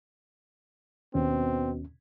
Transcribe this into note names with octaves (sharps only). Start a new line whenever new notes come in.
D#2 B2 C4 C#4